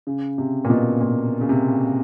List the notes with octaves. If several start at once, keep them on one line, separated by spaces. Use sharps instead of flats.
C#3
C3
A#2
B2
A#2
C#3
C3